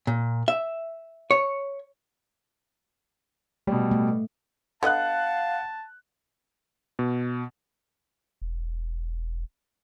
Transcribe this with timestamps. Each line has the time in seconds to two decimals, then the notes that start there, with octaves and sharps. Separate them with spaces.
0.07 A#2
0.48 E5
1.31 C#5
3.67 B2 G3 A3
3.91 A3
4.83 D3 B3 D#5 F5 F#5 A5 F#6
6.99 B2
8.41 E1